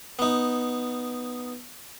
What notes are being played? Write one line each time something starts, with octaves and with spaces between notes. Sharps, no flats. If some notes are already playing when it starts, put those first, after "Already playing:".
B3 D#4